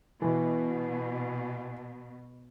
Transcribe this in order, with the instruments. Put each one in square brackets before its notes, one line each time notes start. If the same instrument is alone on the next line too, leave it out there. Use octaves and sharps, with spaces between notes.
[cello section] B2 [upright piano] E3